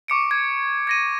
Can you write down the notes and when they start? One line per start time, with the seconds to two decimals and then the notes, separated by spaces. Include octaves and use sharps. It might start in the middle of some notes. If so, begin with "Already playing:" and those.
0.08 C#6 D6 C#7 D7
0.31 G#6
0.87 G#6 A#6 D#7